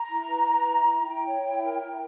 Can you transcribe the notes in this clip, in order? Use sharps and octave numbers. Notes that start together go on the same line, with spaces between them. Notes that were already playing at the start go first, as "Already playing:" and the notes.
Already playing: A#5
E4
B4
B4
E4
E4
E4 G5
C#5
E4
A#4
E4